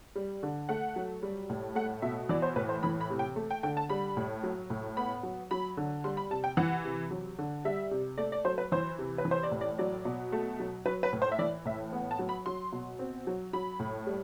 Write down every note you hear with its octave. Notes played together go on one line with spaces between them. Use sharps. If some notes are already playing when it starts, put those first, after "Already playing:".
G3
D3
A3 F#5
F#3
G3
A2
A3 F#5
B2 E5
E3 D5
C5
A2 B4
C5
E3 B5
B5
C3
G5
A3
G5
D3 G5
A5
G3 B5
A2
F#3
A2
B3 B5
F#3
F#3 B5
D3
G3 C6
B5
C3 A5
G5
E3 F#5
C3
F#3
D3
G3 E5
C3
A3 D5
D5
F#3 C5
B4
E3 C5
C3
B4
E3
C5
D5
A2
D5
F#3 D5
B2
A3
F#3
F#3 B4
B4
A2
C5
E5
E3 D5
A2 E5
B3
A5
F#3
B5
F#3 C6
B2
C4
F#3
F#3 B5
A2
G3